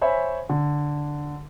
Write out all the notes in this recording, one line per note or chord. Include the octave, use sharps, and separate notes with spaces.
C5 C#5 E5 G#5 B5
D3